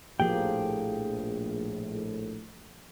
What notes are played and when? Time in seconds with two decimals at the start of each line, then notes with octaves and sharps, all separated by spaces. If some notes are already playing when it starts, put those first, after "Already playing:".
0.20 A#1 A2 F3 A#3 G4 G#4 G5